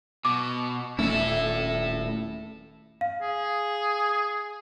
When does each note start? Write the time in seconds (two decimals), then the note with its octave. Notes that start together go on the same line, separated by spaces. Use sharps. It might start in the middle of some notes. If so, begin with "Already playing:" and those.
0.25 B2 D6
0.99 D#1 A3 C#4 E4 A4
3.01 F5
3.22 G#4